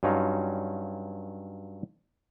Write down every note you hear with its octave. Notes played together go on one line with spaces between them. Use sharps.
G2 F#3 C#4 D#4 F4